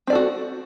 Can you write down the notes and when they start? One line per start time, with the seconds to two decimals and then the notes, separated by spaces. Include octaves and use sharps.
0.07 C4
0.10 D5
0.13 A4
0.15 F#4